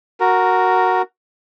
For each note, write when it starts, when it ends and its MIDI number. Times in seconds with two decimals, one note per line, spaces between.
0.20 1.02 66
0.20 1.02 70